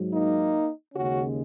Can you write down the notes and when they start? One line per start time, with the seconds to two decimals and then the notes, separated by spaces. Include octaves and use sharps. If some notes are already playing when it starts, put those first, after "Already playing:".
Already playing: G#2 F#3
0.14 A#3 D#4
0.95 D#2 C#3 G#3 C#4 F#4